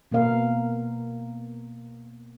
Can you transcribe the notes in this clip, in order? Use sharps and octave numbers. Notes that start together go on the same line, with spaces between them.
B2 A#3 B3 A#4 F5